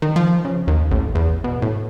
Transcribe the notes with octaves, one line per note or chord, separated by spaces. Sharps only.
D#3
F3
C#3
D#2
A1
E2
B2
A2